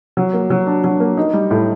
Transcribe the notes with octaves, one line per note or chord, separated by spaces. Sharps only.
F#3
A#3
F#3
D4
F#3
A#3
D#4
G3
A2